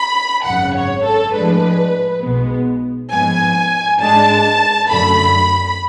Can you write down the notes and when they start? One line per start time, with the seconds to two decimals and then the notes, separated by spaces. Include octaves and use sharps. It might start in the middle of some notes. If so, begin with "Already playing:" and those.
Already playing: B5
0.45 G#1 F#2 C#3 F#5
0.75 C#5
1.05 A4
1.34 A2 F3 G#3 D4 B4
2.23 B1 B2 G#3 B3
3.12 G#2 F3 B3 G#5
4.01 G#2 G#3 D4 A5
4.90 F#2 D3 F#3 A3 B5